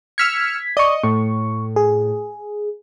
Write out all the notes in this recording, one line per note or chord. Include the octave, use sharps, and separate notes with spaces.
E6 F6 G#6 B6 C#7
D5 D#5 C#6
A2 C#6
G#4